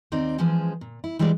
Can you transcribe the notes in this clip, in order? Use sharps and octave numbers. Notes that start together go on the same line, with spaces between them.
D#2 C4 D#4 C5 D5
E3 F3 G#3 C#4 G#4 C5
A#2
E4
E3 G3 G#3 F4 A#4 D5